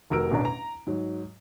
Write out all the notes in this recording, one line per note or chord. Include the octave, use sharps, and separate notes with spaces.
F1 F#4 A#4 E6 D7
A1 B2 C#4 D4 A#5
A#5
G#2 F#3